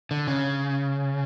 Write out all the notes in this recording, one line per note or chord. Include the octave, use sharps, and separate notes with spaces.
D3
C#3